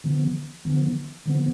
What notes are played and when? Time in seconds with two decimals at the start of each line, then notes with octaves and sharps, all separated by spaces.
0.04 D3 F3 B3
0.65 D3 F3 B3
1.26 D3 F3 B3